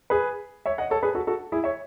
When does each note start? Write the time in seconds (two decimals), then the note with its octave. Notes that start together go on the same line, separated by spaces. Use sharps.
0.10 G#4 B4
0.66 C#5 E5
0.78 D#5 F#5
0.90 A4 C#5
1.03 G#4 B4
1.15 F#4 A4
1.27 F#4 A4
1.52 E4 G#4
1.64 C#5 E5